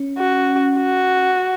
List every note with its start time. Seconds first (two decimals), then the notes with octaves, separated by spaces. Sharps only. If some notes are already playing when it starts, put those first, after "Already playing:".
Already playing: C#4
0.18 F#4
0.77 F#4